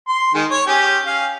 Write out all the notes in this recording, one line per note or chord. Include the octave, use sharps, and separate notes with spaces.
C6
D#3 G#3
C#5
C#4 G4 G#4
C#4 F5